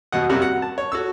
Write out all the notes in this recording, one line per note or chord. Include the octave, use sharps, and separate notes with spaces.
D#2 B2 D#5 F#5
F#2 C3 G3 A#3 F#4 F#5
F#5
A5
C#5
F#4 A4 E6